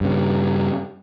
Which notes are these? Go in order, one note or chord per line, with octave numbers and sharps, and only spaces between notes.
G2 C#3